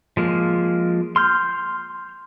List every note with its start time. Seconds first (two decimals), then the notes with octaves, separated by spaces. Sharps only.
0.17 F3 G#3 A#3
1.16 C6 F6 G6